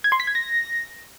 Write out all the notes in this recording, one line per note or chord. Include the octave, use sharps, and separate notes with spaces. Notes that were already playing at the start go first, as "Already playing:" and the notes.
G#6
C6
B6
G#6
A#6